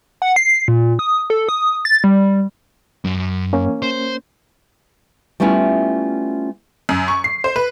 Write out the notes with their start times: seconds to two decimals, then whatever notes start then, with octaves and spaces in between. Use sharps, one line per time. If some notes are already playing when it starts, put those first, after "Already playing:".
0.22 F#5
0.36 C7
0.68 A#2
0.99 D#6
1.30 A4
1.49 D#6
1.85 A6
2.04 G3
3.05 F#2
3.53 A#3 C#4
3.82 C5
5.40 G3 A3 B3 C#4 E4 F4
6.89 F#2
7.08 C#6
7.24 C7
7.44 C5
7.56 B4